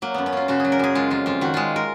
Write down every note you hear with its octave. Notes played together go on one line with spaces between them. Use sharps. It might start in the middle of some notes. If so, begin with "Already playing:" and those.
F#3 A#3
F#2 B3
C#4
A#3 F4
C#3 F#4
F#3 G#4
A#4
F#2 G#4
G#3 F4
F2 F4
F2 F4
D#3 F#4
G#3 F4
A#4